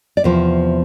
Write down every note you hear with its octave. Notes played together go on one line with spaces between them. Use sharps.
D5
E2 C3 F3 C5